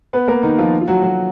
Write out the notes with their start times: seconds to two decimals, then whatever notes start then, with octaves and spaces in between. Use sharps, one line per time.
0.13 B3 B4
0.28 A#3 A#4
0.43 D#3 D#4
0.58 F3 F4
0.81 F4
0.88 F#3 F#4
1.02 F#3 F#4